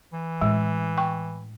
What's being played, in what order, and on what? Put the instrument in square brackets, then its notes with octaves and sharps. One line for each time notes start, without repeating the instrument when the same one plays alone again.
[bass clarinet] E3
[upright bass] A2 C#4 [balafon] G#3
[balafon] G5 C#6